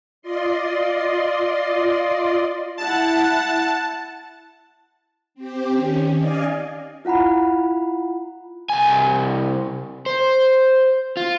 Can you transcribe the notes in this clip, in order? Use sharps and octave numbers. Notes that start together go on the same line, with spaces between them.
F4 D5 D#5 C6
E4 F#5 A5
C4 G4
D#3 C#4
D5 D#5 F5 G#5
E4 F4 F#5 A#5 B5
C2 G#5
C5
F4